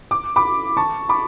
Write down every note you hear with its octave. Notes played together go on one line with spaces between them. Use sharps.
D6
B5 D6
A5 C#6
B5 D6